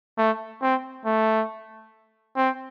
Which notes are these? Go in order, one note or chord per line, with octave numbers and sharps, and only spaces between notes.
A3
C4
A3
C4